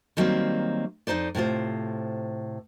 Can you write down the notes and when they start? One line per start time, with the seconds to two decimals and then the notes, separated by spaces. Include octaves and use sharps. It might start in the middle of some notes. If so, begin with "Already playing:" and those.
0.17 D3 D#3 F#3 G3 A#3 C4
1.07 F2 D#3 D#4 C5 D5
1.35 A2 C3 F4 C5